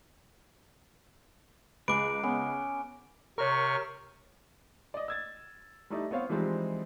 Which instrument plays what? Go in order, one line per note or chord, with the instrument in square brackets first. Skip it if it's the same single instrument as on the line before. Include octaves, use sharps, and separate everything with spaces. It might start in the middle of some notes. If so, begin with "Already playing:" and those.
[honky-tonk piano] C#2 [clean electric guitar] G#4 B4 [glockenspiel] D6 D7
[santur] B3 C#4
[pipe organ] C3 C#6 F6 [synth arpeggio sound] A#4 C#5
[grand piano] D5 D#5
E6 G#6 A6
G3 A3 D#4 E4 D5
B3 C4 C#5 F5
E3 F3 G3 G#3 C4 D#4